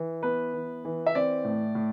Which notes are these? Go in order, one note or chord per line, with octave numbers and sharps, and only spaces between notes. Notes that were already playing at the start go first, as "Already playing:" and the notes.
Already playing: E3
B3 B4
E3
E3
E5
C4 D5
A2
A2